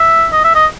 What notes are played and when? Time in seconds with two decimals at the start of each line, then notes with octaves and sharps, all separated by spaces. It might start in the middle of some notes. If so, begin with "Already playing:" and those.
Already playing: E5
0.32 D#5
0.44 E5
0.55 D#5